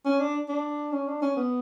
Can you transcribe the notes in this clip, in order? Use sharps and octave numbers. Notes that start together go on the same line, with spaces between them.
C#4
D4
D4
C#4
D4
C#4
B3